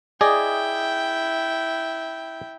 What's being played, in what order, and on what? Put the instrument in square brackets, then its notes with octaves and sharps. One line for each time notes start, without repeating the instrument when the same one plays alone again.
[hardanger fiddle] E4 G5 [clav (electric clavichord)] G#4 D5 D#5